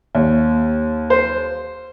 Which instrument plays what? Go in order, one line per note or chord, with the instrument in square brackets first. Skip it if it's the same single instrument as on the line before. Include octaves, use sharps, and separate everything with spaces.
[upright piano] D#2
[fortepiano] C5